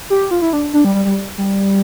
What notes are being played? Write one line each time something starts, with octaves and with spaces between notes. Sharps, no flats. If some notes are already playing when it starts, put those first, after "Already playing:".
G4
F4
E4
D4
D4
G3
G3
G3
G3